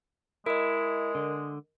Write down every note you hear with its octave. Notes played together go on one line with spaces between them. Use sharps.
G#3 E4 A#4 D#5
D3